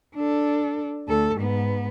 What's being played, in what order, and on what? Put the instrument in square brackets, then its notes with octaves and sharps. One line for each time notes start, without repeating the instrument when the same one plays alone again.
[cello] D4 A4
D2 A4
G#2 B3